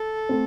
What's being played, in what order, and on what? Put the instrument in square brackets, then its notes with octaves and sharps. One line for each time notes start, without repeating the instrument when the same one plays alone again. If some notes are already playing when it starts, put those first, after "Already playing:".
Already playing: [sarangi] A4
[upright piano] A3 C4